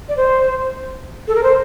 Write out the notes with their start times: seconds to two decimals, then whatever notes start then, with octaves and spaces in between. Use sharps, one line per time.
0.08 D5
0.17 C5
1.27 A4
1.35 A#4
1.43 C5